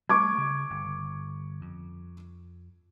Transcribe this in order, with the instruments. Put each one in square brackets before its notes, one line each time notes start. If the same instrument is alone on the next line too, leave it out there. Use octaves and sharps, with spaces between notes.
[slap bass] G3 A3 [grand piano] C#6 D6 G#6
[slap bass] C#3
G1
F2